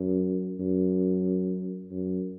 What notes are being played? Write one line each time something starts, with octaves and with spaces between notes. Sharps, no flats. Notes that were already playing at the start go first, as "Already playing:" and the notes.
Already playing: F#2
F#2
F#2